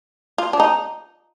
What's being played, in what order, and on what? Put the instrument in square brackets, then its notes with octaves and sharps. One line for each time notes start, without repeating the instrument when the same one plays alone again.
[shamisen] F4
D4
D#4